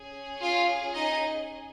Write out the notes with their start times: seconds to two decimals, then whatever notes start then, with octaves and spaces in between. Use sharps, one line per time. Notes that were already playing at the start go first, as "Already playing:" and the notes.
Already playing: C#4 G#4
0.42 F4 F5
0.94 D#4 D#5